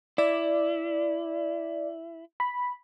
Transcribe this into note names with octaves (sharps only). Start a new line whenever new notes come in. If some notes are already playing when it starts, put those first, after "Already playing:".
E4 D5
B5